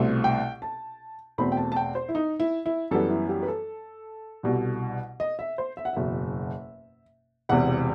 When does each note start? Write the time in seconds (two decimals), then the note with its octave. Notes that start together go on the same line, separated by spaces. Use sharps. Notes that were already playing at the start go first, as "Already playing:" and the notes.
Already playing: C2 B2 A3 C4
0.24 G5
0.62 A5
1.38 E2 B2 A3 C4 B5
1.52 G5
1.57 A5
1.72 A5
1.76 G5
1.95 C5
2.09 E4
2.15 D#4
2.40 E4
2.66 E4
2.91 F#2 E3 G3 B3 A4
3.10 E4
3.29 G4
3.42 B4
3.48 A4
4.43 C2 B2 G3
5.20 D#5
5.39 E5
5.58 C5
5.77 E5
5.85 F#5
5.93 F#1 E2 B2 E5
7.49 E1 E2 C3 F#5